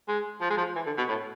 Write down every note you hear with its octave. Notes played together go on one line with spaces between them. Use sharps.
G#3
F3
G#3
F3
E3
D3
B2
A2